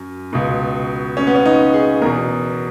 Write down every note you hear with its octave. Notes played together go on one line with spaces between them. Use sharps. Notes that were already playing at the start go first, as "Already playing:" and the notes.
Already playing: F#2
C#2 B2
C#4
B3
C#4
D#4
G#4
E2 B2 A#4